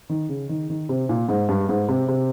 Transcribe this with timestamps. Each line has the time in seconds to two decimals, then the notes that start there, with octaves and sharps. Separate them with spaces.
0.09 D#3
0.29 C#3
0.49 D#3
0.70 D#3
0.89 C3
1.09 A#2
1.29 G#2
1.49 G2
1.69 G#2
1.88 C3
2.08 C3